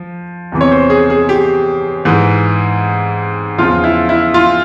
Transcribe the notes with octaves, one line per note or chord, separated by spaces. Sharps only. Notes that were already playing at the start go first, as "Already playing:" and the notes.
Already playing: F3
E2 C3 E3
C#5
C5
G#4
G#4
G4
G#2 E3
E2 C#3 F3 F4
E4
E4
F4